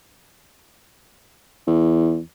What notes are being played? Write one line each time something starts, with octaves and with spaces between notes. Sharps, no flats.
E2